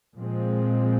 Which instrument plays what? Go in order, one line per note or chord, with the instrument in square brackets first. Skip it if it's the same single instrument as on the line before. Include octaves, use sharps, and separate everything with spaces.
[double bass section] A#2 F3 G#3 C4